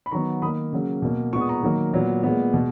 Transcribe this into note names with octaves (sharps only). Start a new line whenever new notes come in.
B5
D#3 F#3 B3 A#5 C#6
D#3 A#3 B5 D#6
C#3 F#3 A#3
B2 A#3
A#2 G#3 B3 C#6
D#6
A#5 C#6
D#3 F#3 A#3
A#2 F#3 B3
A#2 G#3 B3
B2 G#3